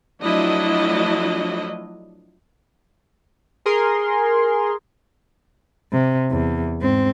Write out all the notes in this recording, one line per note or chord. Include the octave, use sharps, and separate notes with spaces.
F3 F#3 A3 D4 E4 D#5
G#4 A#4 C6
C3
E2
G#2 C4